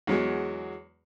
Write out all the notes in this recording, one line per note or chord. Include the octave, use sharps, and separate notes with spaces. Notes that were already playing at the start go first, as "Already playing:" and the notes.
E2 F#3 G#3